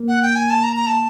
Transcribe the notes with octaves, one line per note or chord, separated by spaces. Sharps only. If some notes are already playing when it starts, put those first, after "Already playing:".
Already playing: A#3
F#5
G5
G#5
A5
A#5
A#5
A5